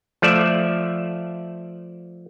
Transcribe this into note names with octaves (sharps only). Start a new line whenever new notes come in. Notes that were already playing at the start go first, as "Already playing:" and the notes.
F3 A3 D5 E5